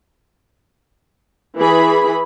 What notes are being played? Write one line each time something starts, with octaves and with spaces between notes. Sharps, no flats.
E3 G#4 B5